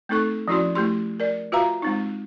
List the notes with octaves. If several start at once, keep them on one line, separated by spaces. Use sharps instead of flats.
A3 C4 D#4 A4 C#6
F3 C#4 E4 F#4 D5 C6
A3 E4 G4 C6
A#4 D5
F4 F#4 B4 E5 F5 A#5
G#3 C4 D#4